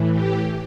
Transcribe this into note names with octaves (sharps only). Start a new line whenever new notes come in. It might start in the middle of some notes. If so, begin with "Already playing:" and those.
Already playing: A2 E3
G4